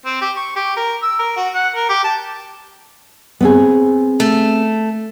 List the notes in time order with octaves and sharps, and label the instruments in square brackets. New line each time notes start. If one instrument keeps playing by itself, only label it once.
[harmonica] C4
G4
C#6
G4
A#4
E6
A#4
F#4
F#5
A#4
G4
A5
[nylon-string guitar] B3 C4 G#4
[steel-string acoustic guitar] A3